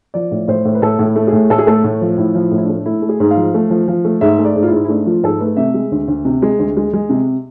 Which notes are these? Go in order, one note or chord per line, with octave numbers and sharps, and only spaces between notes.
F3 D5
A2
A2 C5
A2
B4
A2 A4
A2
E4
A3
G#4
A2
A2 A4
G#4
A3 A4
A2
F3
A2 E4
F3
E4
A2
E4
D4
A3
A3 E4
A3
G#4
G#2
F5
F3
A3
F3
F3
A3
G#2 E5
A3
D5
G#2
F4
E4
G#2
E4
A3 D4
F3 F4
G#2 A4
A3 B4
C3 E5
G#3
D2
D2
C3
G#3
D2
G#3
G#3
C3